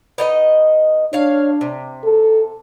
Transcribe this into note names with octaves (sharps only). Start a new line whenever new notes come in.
B3 D#4 D#5
D4 C#5 F5
C3
A4